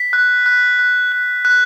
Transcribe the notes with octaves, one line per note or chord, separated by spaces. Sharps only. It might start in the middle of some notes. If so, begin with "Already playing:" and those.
Already playing: B6
F#6
F#6
F#6
F#6
F#6